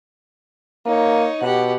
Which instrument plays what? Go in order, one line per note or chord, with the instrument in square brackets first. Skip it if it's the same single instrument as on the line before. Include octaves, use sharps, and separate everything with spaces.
[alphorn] A#3 [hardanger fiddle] D#4 C#5
[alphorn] B2 [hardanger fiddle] G4 F#5